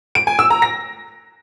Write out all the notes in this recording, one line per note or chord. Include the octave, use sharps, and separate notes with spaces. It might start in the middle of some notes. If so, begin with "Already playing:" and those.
D7
G#5
E6
A#5
A#6